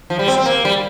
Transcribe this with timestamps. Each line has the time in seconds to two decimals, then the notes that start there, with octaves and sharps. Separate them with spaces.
0.10 F3
0.19 G3
0.28 C4
0.38 C4
0.46 A#3
0.65 G3